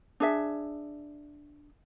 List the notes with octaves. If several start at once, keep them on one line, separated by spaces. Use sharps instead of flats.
D4 G#4 E5